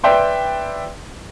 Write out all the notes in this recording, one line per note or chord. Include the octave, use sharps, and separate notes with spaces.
B4 D5 E5 G5 C6